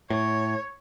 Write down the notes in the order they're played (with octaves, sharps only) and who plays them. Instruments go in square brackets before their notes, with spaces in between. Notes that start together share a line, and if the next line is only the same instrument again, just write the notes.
[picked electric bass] A2 [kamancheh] C#5